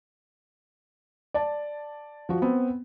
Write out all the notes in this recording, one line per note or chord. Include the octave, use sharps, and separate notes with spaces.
D5 A5
F3 F#4
B3 C4